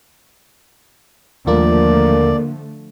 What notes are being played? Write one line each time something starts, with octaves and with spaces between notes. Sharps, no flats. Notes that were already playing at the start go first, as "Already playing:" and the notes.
D#2 D3 F3 A3 A#3 F4 A#4 D5